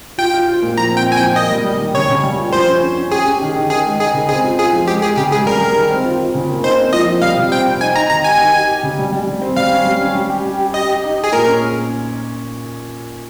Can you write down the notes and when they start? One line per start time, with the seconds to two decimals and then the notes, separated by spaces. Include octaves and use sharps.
0.18 F4 G5
0.33 F4
0.48 F4
0.62 A#2
0.77 F3 A#5
0.91 C4
0.97 G5
1.06 C4
1.12 G#5
1.17 G5
1.21 F3
1.36 A#3 D#5
1.51 G3
1.65 G3
1.80 D#3
1.94 C#3 C#5
2.09 C#3
2.23 G3
2.39 F4
2.53 F3 C5
2.68 C#4
2.82 C#4
2.97 C#4
3.11 G4 G#4
3.27 C#4
3.42 D#3
3.56 D#3
3.70 D#4 G#4
3.86 G#3
4.00 D#4 G#4
4.14 C#3
4.29 C4 G#4
4.44 F4
4.58 F4 G#4
4.73 F3
4.87 G#3 G4
5.02 G#3 G#4
5.17 C#3 G4
5.32 G#3 G#4
5.46 G3 A#4
5.61 G3
5.76 D#3
5.91 C4
6.05 F4
6.19 F4
6.34 C#3
6.49 A#3
6.64 D#4 C5
6.78 C4
6.93 F3 D#5
7.07 F3
7.22 G3 F5
7.37 C3
7.52 C4 G5
7.66 C4
7.81 D#4 G#5
7.96 D#4 A#5
8.10 D#3 A#5
8.24 G4 G#5
8.39 D#4
8.55 G4
8.69 G4
8.83 C#3
8.99 G3
9.12 G3
9.27 G3
9.42 C4
9.57 G3 F5
9.71 C#4
9.86 G3
10.01 C#4
10.15 G3
10.30 G4
10.45 G4
10.59 G4
10.74 G4 D#5
10.89 G4
11.04 D#4
11.18 G4
11.24 G#4
11.32 A#2 A#4
11.47 C#4